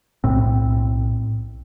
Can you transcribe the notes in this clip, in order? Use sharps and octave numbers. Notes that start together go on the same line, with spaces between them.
B1 A2 C4